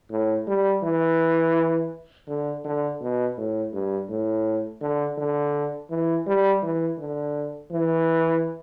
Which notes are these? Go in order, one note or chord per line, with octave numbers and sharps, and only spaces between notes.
A2
G3
E3
D3
D3
B2
A2
G2
A2
D3
D3
E3
G3
E3
D3
E3